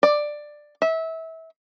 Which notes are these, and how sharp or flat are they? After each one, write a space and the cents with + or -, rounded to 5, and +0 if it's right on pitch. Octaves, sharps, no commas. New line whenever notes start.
D5 +10
E5 -25